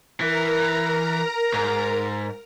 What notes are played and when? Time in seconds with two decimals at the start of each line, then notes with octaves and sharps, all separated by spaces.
0.21 E3 A#4 A#5
1.53 G#2